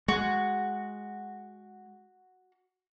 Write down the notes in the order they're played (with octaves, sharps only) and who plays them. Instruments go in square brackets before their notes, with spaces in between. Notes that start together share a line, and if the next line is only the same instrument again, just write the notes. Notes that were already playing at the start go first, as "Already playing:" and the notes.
[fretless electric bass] G#3 [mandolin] F#4